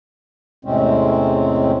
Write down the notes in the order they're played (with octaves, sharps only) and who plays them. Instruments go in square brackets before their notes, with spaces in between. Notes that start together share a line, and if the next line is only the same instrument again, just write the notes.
[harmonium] E2 A2 C3 G#3 C4 C#4